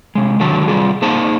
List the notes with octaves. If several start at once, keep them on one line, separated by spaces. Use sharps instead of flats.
C3 G#3
D3 D#3 F#3 A5
G3 F4 G#4
A#3 D#4 G#4 C5 A5